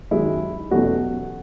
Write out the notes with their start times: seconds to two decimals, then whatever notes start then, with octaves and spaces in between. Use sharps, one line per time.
0.11 F#2 D#3 G#3 E4
0.71 E2 B2 F#3 A3 C#4 F#4